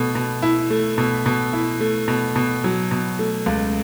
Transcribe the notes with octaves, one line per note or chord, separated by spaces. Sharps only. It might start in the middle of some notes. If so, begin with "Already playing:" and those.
Already playing: B2 A3
B2
E4
A3
B2
B2
E4
A3
B2
B2
F#3
B2
A3
C#2